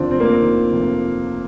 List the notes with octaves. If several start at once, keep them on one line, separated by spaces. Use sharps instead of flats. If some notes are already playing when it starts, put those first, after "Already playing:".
Already playing: F1 D#2 C4 D4 F4
F1 C4
A#3
C4
D#3
F1